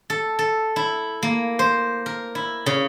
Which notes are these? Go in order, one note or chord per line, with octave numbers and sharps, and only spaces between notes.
A4
A4
E4
A#3
C5
A#4
E4
C#3